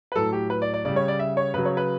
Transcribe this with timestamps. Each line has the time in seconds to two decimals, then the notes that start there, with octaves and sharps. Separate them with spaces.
0.12 B4
0.15 A2 F#3 A4
0.33 G4
0.50 B4
0.62 D5
0.74 D5
0.85 C#3 G3 D5
0.96 C#5
1.08 D5
1.19 E5
1.37 C#5
1.54 C#3 F#3 B4
1.65 C#5
1.77 B4